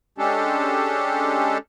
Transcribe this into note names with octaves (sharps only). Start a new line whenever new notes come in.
G#3 C#4 D4 G4 A4